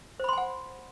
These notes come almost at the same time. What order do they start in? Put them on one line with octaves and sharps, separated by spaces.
C5 B5 C6 G#5 F#5